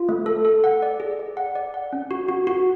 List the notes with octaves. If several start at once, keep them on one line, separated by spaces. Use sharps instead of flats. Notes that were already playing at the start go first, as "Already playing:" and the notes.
Already playing: F4
A3
A4
A4
F#5
D5
G#4
D5
F#5
D5
F#5
C#4
F#4
F#4
F#4